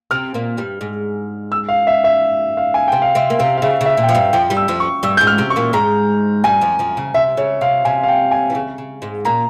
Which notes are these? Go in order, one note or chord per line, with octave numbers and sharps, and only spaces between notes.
C3 C4 F6
A#2 A#3
G2 G3
G#2 G#3
E6
F5
E5
E5
F5
G#5
C3 C4 G5
F5
C3 C4 E5
A#3
C3 C4 F5
F5
C#3 E5
C#3
E5
A#2
G5
F3 F5
G2 G3
F2 F3 G5
G2 G3
E6
F2 F3
C#6
G2 G3 E6
G#2 G#3 G6
F6
C3 C4
C#6
A#2 A#3
G#2 G#3 A#5
G2 G3 G#5
F2 F3
F2 F3
C#3
C3 E5
C#3 C#5
C3 F5
C3 G#5
F5
G5
G#5
E3
C#3
C#3
G#2 G#3
A#2 A#3 A#5